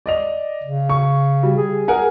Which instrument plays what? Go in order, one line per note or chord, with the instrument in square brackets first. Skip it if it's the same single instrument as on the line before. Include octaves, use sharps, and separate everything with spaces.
[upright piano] D5 D#5 F7
[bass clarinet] C#3
[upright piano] C#6
G3
[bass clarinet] G#4
[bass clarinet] G#4 [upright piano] A#4 F#5 G#5